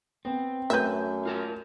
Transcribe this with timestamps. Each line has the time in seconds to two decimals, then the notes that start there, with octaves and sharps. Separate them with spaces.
0.25 B3 C4
0.70 F#2 A3 B4 E5 G6
1.26 F4 A#4 A5